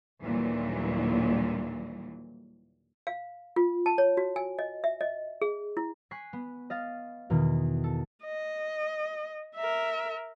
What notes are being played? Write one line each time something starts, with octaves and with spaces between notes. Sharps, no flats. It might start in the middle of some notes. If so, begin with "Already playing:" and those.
D#2 A#2 D3 E3 F#3 G3
F5
F4
A5
C#5
F#4
G#5
D#5
E5
D#5
G#4
E4
G#5 C#6 F#6 B6 C7
B3
D#5 F5 A6
E2 B2 D#3
A4
D#5
A#4 E5